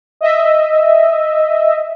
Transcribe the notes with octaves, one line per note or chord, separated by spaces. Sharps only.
D#5 E5